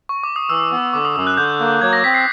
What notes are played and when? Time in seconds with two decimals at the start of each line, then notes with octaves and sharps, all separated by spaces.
0.09 C#6
0.23 D6
0.36 D#6
0.49 E3 E6
0.71 B3
0.94 D3 D6
1.05 D#6
1.16 F#2 E6
1.27 F#6
1.37 D3 G6
1.60 A#3
1.81 F#3 G#6
1.93 A#6
2.04 C4 B6
2.14 C7